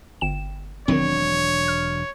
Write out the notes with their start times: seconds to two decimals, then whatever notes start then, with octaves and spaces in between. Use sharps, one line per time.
0.21 G1 G5 E7
0.88 E1 D#3 F#3 C4 D4 C#5
1.68 F6